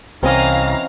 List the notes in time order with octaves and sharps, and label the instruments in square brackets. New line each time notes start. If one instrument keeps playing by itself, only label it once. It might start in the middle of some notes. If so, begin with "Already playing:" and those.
[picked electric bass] C2 [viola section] E3 F5 A#5 [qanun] C4 C#4 D#5